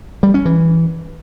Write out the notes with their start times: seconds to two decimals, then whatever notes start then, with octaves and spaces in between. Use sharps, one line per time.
0.23 G3
0.34 C#4
0.45 E3